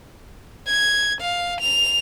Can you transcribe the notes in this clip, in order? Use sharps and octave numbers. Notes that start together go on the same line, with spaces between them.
G#6
F5
F7